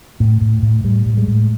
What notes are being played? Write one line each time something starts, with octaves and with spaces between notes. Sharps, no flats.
A2
A2
A2
A2 G3
A2
G#3
A2